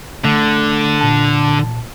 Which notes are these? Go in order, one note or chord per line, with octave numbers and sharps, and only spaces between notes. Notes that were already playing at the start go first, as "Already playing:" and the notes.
D3 A3
A#2 A5